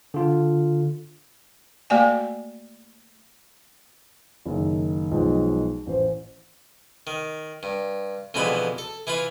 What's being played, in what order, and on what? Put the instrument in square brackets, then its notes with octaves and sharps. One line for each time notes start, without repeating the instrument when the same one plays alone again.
[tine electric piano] D3 F4
[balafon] A3 A#3 F#4 D5 G5 G#5
[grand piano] F#1 D#3
B1 F3 G#3
A1 C5
[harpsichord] D#3
G2
F2 B2 D3 E3 G#3 B5
A4
E3 E4 F4 B5